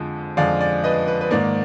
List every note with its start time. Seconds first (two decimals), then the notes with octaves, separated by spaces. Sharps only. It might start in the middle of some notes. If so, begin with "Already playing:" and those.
Already playing: F2 D3 F3 G#3
0.37 F2 D3 F3 G#3 D5 F5
0.61 D5
0.84 B4 D#5
1.08 B4
1.21 B4
1.31 G#2 D#3 A#3 D5